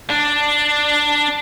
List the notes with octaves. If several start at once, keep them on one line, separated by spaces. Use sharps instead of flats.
D4